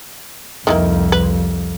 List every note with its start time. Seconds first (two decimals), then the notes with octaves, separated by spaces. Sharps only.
0.67 C2 F2 D#3 E3 A#3
1.12 B4